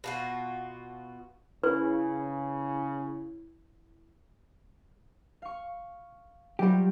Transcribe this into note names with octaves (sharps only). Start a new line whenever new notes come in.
B2 F4 F#4
C#3 E4 B4
F5 C#6
F#3 G3 F4 G4